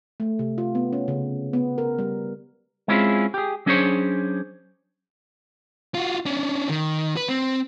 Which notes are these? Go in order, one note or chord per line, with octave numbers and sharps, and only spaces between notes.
A3
C3
F4
B3
C#4
C#3
B3
A#4
G3
G#3 C4 C#4 E4 F4 G#4
G4 G#4
F#3 C#4 D4 G#4 C5 C#5
F4 F#4
C#4 D4
D#3
B4
C4